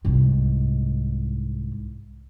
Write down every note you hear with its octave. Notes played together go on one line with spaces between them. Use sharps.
C2 G#2